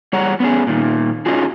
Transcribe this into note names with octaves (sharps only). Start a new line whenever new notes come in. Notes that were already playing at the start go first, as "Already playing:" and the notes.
G3 G#4 C#5 F#5 A#5
B3 C#4 G#4
A#2 D#3
C#4 D#4 F4 F#4 G#4